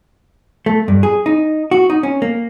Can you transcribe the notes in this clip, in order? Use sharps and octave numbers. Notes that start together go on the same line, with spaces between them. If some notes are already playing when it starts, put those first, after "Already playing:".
A3
G2
G#4
D#4
F#4
D#4
C#4
A#3